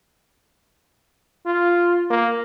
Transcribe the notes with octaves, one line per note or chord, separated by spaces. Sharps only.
F4
A#3